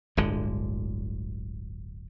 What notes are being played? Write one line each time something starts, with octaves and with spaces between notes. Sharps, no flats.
D1 G1 D3 G#3